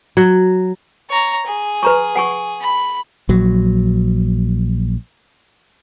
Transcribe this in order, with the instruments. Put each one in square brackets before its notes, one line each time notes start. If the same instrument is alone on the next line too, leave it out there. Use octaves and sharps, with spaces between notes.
[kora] F#3
[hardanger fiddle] C#5 A#5
G#4
[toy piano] B4 A#5 C#6
F#5 G#5 C#6
[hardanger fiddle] B5
[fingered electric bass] A#1 F#3